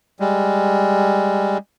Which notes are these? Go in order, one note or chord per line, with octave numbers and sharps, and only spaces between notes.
G3 G#3